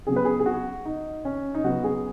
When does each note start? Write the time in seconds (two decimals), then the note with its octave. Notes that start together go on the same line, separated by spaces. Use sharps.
0.07 C#3 F#3 B3 G#4
0.16 B4
0.25 G#4
0.40 G#4
0.46 F#4
0.85 D#4
1.25 C#4
1.54 D#4
1.64 C#3 F#3 B3 F#4
1.84 G#4